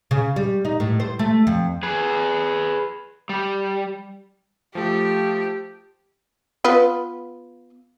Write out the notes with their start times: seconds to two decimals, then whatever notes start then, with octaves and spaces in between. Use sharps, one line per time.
0.11 C#3
0.36 G3
0.65 D#4
0.80 A2
1.00 C5
1.19 A3
1.47 F2
1.83 G#4 B4
3.29 G3
4.75 F3 A3 G4
6.64 B3 F4 B4